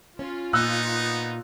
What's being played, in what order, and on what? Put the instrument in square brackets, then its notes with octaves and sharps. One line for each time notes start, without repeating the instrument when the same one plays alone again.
[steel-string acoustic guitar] C#4 [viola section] F4
[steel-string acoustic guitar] A#2 [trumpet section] B3 D#4 [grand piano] E6 F#6